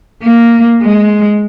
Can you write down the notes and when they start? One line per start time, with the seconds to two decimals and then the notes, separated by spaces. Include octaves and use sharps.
0.22 A#3
0.82 G#3